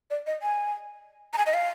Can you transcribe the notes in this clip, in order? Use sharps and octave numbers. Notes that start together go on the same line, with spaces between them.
D5
D#5
G#5
A#5
G#5
D#5
F5